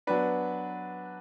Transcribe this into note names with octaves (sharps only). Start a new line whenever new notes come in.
F#3 B3 D4 B4